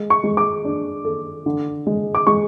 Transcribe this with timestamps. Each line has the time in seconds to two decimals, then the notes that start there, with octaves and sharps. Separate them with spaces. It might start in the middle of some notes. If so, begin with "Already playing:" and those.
Already playing: G#3
0.10 C#6
0.24 G#3
0.37 D6
0.65 D4
1.05 A4
1.46 D3
1.87 G#3
2.15 D6
2.27 G#3 C#6